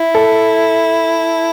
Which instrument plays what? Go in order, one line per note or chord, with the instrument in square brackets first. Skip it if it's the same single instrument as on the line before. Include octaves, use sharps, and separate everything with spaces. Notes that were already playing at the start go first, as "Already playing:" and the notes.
Already playing: [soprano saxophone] E4
[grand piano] A4